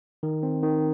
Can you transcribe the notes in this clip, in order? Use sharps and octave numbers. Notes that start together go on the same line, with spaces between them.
D#3
C4
D#3